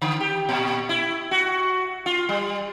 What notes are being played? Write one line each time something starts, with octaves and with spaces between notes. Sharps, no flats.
D3
G4
A#2
E4
F#4
F4
G3